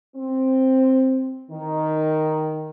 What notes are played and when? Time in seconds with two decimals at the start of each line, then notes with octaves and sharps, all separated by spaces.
0.17 C4
1.52 D#3